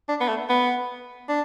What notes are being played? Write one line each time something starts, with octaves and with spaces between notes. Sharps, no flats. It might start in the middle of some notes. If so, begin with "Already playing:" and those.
D4
B3
A3
B3
D4